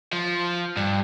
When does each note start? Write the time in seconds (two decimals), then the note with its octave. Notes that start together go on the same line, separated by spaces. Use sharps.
0.13 F3
0.77 G2